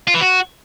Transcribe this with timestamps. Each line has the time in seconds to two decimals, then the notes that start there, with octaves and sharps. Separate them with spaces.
0.07 F4
0.14 E3
0.21 F#4